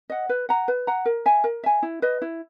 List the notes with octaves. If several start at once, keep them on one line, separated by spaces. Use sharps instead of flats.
D#5 F#5
B4
F#5 A#5
B4
F#5 A#5
A#4
E5 G#5
A#4
E5 G#5
E4
B4 D#5
E4